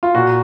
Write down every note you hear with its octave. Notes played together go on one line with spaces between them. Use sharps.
F4
A#2 F#4